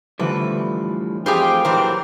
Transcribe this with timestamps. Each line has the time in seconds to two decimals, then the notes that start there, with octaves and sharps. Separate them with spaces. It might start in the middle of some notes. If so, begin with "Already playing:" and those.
0.19 A2 D3 E3 F3 G3 C4 B4
1.26 F2 A3 F4 G4 G#4 C5 G5 B5
1.65 A#2 E3 F#3 G4 A#4 C5